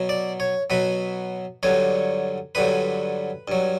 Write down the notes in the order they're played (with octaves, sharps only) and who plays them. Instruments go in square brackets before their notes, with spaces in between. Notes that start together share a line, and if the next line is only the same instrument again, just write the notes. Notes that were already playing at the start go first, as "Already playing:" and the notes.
Already playing: [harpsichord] B2 F#3
D5
C#5
B2 F#3 B4
G2 D3 F#3 C#5
G2 D3 F#3 B4
G2 F#3